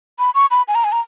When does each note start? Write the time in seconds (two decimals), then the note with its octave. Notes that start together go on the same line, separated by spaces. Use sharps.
0.19 B5
0.35 C#6
0.51 B5
0.68 G#5
0.75 A#5
0.84 G#5
0.92 A#5